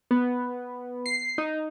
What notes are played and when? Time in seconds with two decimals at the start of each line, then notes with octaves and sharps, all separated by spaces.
0.11 B3
1.06 C7
1.38 D#4